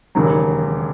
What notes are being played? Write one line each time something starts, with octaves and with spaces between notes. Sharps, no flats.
E1 D#2 C#3 F#3